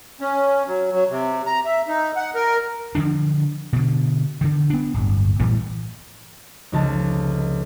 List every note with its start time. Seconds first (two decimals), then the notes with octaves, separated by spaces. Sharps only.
0.21 C#4
0.67 F#3
0.92 F#3
1.10 C3
1.46 A#5
1.65 E5
1.88 D#4
2.16 F#5
2.35 A#4
2.95 D3 E3 F3 D4
3.73 B2 D3
4.41 D3 D#3
4.70 B3 D4
4.94 D1 G1
5.39 A2 E3 G3
6.72 F1 C#2 A5